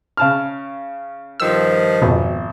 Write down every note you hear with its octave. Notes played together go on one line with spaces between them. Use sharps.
C#3 A5 F6
G2 D#3 F3 E6
G#1 F2 B2